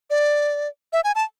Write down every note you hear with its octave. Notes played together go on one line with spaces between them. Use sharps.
D5
E5
G#5
A5